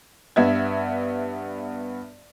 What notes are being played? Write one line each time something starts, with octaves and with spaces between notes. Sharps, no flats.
G2 B3 E5 G#6